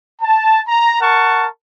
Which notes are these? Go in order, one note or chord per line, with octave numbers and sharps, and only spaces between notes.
A5
A#5
A#4 F#5 A5 C#6